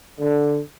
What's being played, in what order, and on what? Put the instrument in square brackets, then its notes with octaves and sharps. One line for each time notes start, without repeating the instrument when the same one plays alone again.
[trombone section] D3